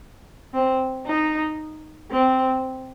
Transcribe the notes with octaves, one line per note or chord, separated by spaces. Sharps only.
C4
D#4
C4